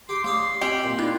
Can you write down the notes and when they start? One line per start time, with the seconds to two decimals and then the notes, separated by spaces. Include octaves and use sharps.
0.09 G4 G5 C6
0.24 A3 D4 G4 C#5 C6 D#6
0.61 C4 G4 D#5 G5 B5
0.84 A#2
0.98 D#4 E4 D5 F#6